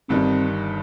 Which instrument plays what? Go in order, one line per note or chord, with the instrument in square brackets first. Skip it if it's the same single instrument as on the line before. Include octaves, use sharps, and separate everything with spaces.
[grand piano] G1 G2 D#3 G3 [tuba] C4